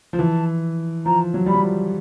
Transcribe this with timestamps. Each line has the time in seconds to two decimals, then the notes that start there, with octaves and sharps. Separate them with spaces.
0.13 F3
0.19 E3 A5
1.06 F3 A#5
1.34 F#3
1.46 G3 B5
1.54 F#3
1.63 F3